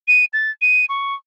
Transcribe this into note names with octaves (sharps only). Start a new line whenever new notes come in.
D#7
A6
D#7
C#6